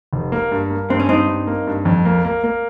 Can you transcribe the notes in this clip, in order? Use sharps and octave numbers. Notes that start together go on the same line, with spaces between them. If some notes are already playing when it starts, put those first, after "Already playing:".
F1
A#3
G2
A#3
G2 C4
C#4
G2 C4 D#4
G2
A#3
G2
F2
A#3
A#3
A#3